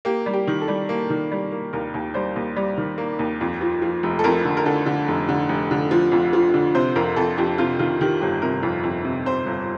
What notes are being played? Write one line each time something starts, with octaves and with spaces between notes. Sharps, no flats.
A#3 G4
G3
G4
D#3
A4
G3
A#3
D#3
G3
A#3
D#2 A#4
D#2
G3 C5
D#2
G3
D#3
A#3
D#2
F2
F3
F3
F1
A4
F2 A#4
D3
A#4
D3 A4
D3
F1
D3
F1
D3
F3
F2
F3
D3
C3 C5
F2 A#4
F2 A4
F2 G4
C3 F4
D#3 F4
D#3 G4
G1 G4
C3 A#4
F2
F2
C3
C3 C5
G1